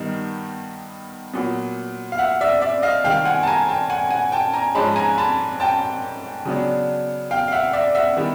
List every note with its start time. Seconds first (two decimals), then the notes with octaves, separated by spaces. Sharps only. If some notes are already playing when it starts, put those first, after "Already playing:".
Already playing: G2 D#3 G3 B3 D#4
1.33 A#2 F#3 B3
2.12 F5
2.18 E5 F#5
2.41 D5 E5
2.61 D5 E5
2.82 D#5 F5
3.04 C3 D#3 G3 F5 G5
3.25 F#5 G#5
3.43 A5
3.47 G#5 A#5
3.68 G5 A5
3.90 F#5 G#5
4.11 F#5 G#5
4.32 G5 A5
4.54 G#5 A#5
4.75 G#2 F3 G#3 C#4 A5 B5
4.96 G#5 A#5
5.18 A5 B5
5.60 G5 A5
6.45 C#3 F#3 B3 D4
7.31 F5 G5
7.48 F5
7.52 E5 F#5
7.73 D5 E5
7.95 E5 F#5
8.17 D#3 G3 B3 E4